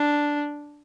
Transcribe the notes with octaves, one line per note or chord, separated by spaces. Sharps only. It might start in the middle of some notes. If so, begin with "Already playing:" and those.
Already playing: D4